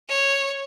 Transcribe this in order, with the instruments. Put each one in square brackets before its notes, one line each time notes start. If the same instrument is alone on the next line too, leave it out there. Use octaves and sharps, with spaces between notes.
[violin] C#5